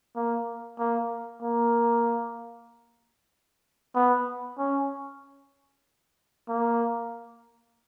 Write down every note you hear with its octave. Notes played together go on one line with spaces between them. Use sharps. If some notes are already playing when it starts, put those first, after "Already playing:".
A#3
A#3
A#3
B3
C#4
A#3